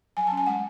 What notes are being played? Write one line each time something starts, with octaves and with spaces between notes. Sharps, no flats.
F#3 G#5
A5
C#4
G#5
G#3 F#5